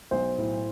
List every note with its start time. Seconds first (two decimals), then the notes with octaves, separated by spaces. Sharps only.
0.11 B1 C5
0.38 A2